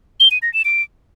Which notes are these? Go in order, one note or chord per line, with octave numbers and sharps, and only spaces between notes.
G7
D#7
A#6
E7
D7